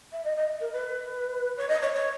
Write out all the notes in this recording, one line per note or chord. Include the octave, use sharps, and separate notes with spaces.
E5
D#5
D#5
A#4
B4
C#5
D#5
C#5
C#5